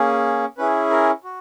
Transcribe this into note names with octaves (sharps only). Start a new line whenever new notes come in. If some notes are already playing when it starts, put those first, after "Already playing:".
Already playing: A#3 C#4 G#4
C#4 E4 G#4 B4
A#4
F#4